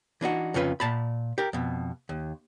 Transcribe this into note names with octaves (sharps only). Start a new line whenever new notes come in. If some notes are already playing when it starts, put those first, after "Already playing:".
E3 D4 D#4 F#4
F2 C#3 C#4 F4 B4
A#2 A5 B5
G4 A#4
F2 B2
D#2